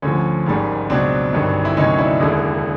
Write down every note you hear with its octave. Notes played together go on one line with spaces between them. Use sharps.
D2 D3 F3 C#4
G#1 G#2 D#3 G3
C#2 B2 F#3 C4 D4
G1 G2 D#3 F#3
E4
D2 C3 D#3 F#3 C#4 D#4
D4 E4
E1 D#2 D3